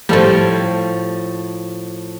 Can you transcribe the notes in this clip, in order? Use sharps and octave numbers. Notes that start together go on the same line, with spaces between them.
A2 F3 G3 A4 C5